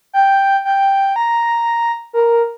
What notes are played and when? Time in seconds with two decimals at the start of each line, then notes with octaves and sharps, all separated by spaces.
0.13 G5
0.65 G5
1.16 A#5
2.13 A#4